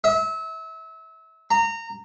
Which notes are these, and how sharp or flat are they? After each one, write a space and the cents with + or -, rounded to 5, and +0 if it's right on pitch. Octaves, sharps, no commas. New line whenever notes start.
E5 -30
A#5 -25